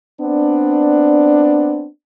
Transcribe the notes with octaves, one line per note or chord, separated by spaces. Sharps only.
B3 C4 D4